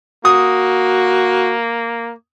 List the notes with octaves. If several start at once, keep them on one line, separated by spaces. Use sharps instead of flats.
A#3 F#4 D#6